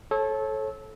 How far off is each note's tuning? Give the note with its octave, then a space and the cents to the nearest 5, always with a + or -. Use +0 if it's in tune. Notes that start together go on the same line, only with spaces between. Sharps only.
A4 -20 C#5 -30